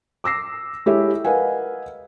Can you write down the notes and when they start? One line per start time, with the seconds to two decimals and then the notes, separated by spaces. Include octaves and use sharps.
0.24 D6 E6 A#6 C7
0.86 G#3 E4 G4 A4 C#5 E5
1.25 A#4 B4 D#5 F5 F#5 G#5